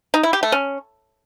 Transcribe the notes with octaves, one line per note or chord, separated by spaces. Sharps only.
D#4
E4
G4
A3
C#4